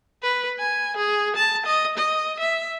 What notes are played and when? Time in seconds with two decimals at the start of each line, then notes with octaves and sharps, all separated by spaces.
0.23 B4
0.59 G#5
0.97 G#4
1.36 A5
1.66 D#5
1.98 D#5
2.40 E5